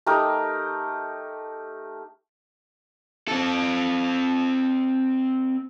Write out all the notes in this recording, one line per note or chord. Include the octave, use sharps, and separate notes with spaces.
A3 D#4 G4 A#4
C4 A4